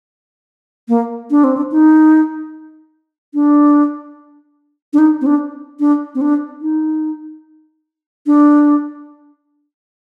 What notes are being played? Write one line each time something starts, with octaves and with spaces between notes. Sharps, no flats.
A#3
D4
C4
D4
D#4
D4
D4
D#4
C4
D4
D4
C4
D4
D#4
D4